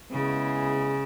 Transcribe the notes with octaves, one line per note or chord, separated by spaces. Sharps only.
C#3 G#3 B3 E4 G#4